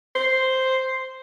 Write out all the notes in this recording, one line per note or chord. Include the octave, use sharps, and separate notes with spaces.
C5